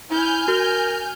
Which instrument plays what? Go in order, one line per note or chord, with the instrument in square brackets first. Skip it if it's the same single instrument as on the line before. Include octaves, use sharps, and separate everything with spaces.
[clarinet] E4 [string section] G#5 F6 G6
[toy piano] F#4 [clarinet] A#4